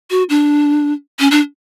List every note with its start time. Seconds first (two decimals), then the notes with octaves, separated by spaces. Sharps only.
0.10 F#4
0.30 D4
1.20 C#4
1.31 D4